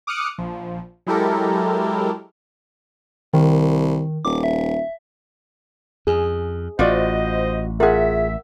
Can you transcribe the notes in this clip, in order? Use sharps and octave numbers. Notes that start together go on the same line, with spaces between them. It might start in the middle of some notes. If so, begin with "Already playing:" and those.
D6 D#6 F6 F#6 C#7
A#1 F3
F#3 G#3 E4 G4 A4 A#4
C2 D#3
D#1 D6
E5
F2 G#4
A1 F4 F#4 C5 D5 D#5
F4 G#4 A#4 E5 F#5